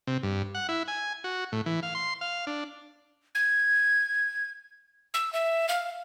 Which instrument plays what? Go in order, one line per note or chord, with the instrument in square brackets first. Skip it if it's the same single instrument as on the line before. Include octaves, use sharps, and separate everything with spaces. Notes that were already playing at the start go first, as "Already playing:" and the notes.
[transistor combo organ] C3
G2
F#5
E4
G#5
F#4
A2
E3
F5
C6
F5
D4
[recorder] G#6
E6
E5
F5